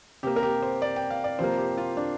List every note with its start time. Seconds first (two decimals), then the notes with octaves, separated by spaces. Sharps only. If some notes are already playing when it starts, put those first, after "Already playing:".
0.23 C3 A#3 G4
0.36 A#4
0.43 G4
0.63 C5
0.82 D5
0.96 G5
1.10 F5
1.24 D5
1.39 C3 F3 A#3 C5
1.58 G4
1.78 F4
1.97 D4